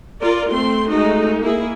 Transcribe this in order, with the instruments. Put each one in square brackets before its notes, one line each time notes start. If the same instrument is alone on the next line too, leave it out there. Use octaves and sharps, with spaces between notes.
[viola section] F4 A#4 D5
A3 C4 C6
G#3 A3 D#4 F#4
A#3 E4 G#4